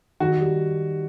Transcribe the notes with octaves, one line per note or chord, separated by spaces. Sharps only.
D#3 F#4
G3